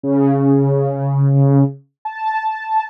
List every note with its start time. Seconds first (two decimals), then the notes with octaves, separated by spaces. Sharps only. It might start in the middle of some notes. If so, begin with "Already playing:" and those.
0.03 C#3
2.05 A5